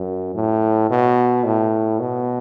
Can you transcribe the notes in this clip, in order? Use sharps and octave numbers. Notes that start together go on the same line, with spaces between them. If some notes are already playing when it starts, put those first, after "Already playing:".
Already playing: F#2
A2
B2
A2
B2